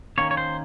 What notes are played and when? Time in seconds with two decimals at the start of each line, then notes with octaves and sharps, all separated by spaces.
0.18 D#3 A#3 C#4 C#5
0.31 C#5
0.37 C5